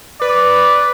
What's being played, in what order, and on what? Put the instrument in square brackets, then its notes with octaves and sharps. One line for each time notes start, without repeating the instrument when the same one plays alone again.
[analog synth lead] B4 [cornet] D5